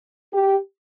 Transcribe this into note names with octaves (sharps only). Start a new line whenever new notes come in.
G4